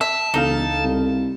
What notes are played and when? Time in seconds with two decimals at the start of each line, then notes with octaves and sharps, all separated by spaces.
0.01 E5 A5
0.34 E1 C#2 D#4 A4 F5
0.84 C2